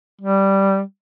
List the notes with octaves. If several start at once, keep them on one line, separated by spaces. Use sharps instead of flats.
G3